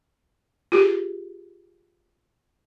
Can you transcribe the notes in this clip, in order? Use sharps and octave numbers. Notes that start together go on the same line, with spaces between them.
F4 G4 G#4